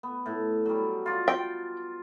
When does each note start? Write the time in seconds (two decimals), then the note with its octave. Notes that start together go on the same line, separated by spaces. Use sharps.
0.03 B3
0.26 A2
0.66 F#3 G3
1.06 F4 D5
1.28 G5